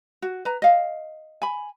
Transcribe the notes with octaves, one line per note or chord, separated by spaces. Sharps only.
F#4
B4 A#5
D#5 F5
G#5 B5